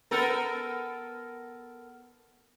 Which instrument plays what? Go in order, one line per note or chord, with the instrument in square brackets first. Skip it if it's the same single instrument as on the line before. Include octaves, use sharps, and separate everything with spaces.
[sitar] B3 A4 A#4